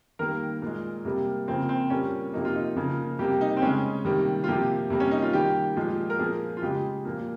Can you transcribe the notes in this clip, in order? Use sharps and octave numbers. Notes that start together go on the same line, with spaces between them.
D#3 G3 A#3 A#4
A#2 G#3
C3 G3 A#3
C#3 F3 A#3 C4
C4
A#2 G3 A#3 C#4
C3 F3 A#3 D#4
F4
D#4
C#3 F3 A#3
C3 G3 A#3 G4
D#4
C4
C#3 G#3 C#4
C3 D#3 G3 A#3
F4
C3 F3 A#3 G4
C3 G3 A#3
C#4
D#4
F4
D#3 G3 A#3 G4
A#2 F3 G#3
A#4
A#2 F3 A#3 G#4
F4
C#3 G#3 G4
A#2 F3 A#3